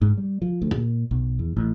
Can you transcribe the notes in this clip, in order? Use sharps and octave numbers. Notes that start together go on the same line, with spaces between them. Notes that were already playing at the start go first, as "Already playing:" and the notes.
G#2
G3
F3
D2
A#2
B1
E2
A1